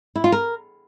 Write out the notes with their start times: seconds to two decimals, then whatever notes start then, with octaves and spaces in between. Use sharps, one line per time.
0.16 E4
0.24 F4
0.32 A#4